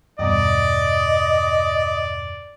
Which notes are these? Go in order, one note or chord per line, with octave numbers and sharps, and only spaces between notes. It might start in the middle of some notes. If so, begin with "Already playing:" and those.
E2 G2 B2 D5 D#5